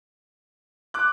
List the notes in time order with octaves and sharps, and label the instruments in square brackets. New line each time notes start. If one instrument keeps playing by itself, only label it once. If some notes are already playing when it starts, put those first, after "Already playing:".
[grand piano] D6 F#6